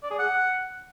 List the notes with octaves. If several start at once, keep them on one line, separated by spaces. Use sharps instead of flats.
D5
G#4
F#5